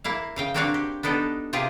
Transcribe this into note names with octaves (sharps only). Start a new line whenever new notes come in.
A#3 E4 F5
C#3 F5 G5
A#3 C4 D4 F#4 C#5 F5
G4
B3 D4 D#4 A4
C3 F4 G4 G#4 F5